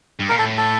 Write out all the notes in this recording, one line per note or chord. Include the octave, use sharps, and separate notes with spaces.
G2
A#2 A#4
A2 A4
A4